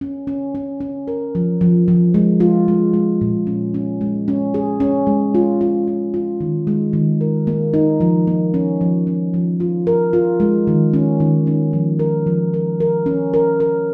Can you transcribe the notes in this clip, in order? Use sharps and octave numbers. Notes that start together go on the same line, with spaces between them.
C#4
C#4
C#4
C#4
A#4
F3
F3
F3
G#3
F4
G#3
G#3
A#2
C#4
C#4
G#3
C#4
G#4
C#4
G#3
F4
F4
F4
F4
D#3
G#3
D#3
A#4
A#3
D#4
F3
A#3
C#4
F3
C#4
F3
F4
A#4
F4
G#3
D#3
C#4
D#3
C#4
F3
A#4
F3
A#4
A#4
C#4
A#4
A#4